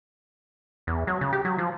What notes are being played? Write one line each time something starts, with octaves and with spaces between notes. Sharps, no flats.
E2
F#3
C#3
G4
F#3
F3